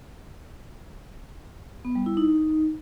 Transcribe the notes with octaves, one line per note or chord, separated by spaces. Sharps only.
B3
G3
E4
D#4